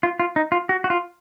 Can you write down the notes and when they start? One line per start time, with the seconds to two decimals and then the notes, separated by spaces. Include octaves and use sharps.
0.03 F4
0.20 F4
0.36 D#4
0.52 F4
0.69 F#4
0.84 F#4
0.90 F4